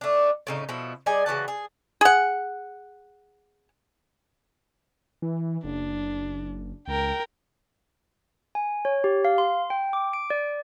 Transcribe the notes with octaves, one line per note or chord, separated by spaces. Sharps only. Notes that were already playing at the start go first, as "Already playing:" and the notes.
A3 D4
A2 C#3 D#4
B2 F3 E4
G3 G#4 D#5 G#5
C#3 E3 F#4 A5
G#4
G#4 F#5
E3
F#1 D4
C#2 A#4 G5
G#5
C#5
G4
F5
C6
G5
D6
D7
D5